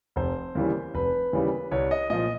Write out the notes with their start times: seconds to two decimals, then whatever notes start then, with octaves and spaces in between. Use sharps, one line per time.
0.16 F1 C5
0.55 D#2 C#3 E3 G3
0.94 F1 B4
1.33 D#2 C#3 E3 G3
1.71 C2 C#5
1.91 D#5
2.10 A#2 F3 D#5